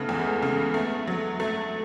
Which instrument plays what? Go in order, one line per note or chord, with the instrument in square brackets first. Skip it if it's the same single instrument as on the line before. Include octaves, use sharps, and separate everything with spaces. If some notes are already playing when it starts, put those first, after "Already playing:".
Already playing: [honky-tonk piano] C#3 [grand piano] A3 B3 C#4 D#4
[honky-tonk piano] E2 [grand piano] G#3
[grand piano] A3
G#3
[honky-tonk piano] C#3 [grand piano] A3
[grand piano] B3
[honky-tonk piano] A3
F#3
A3